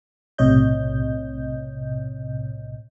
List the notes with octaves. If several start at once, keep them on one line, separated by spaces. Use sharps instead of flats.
B1 A2 C3 C#5 D#5 G6